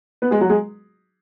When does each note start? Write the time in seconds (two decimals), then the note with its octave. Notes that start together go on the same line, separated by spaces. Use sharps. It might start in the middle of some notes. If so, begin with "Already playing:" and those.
0.22 B3 B4
0.31 G#3 G#4
0.41 F#3 F#4
0.50 G#3 G#4